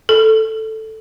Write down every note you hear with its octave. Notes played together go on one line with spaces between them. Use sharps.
A4